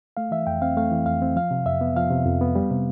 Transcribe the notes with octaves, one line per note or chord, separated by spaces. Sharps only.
A3 F5
E3 E5
F2 G5
C4 F5
A3 F5
E3
F2 F5
C4
F3 F5
C3
F2 E5
B3
F3 F5
C3
F2
B3
G3
C3